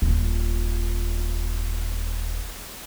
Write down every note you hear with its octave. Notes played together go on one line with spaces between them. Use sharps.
D#1 F4